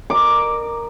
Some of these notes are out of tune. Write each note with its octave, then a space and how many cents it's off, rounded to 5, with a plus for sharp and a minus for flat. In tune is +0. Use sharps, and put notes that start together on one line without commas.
A#4 +0 D#5 -45 D6 +0